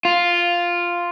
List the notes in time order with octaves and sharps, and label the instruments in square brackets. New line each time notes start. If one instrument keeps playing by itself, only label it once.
[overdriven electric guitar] F4